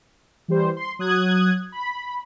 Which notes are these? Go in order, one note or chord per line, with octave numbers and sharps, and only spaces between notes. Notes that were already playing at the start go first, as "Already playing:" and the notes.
E3 G3 C5
C6
F#3 D#6 F#6 G#6
B5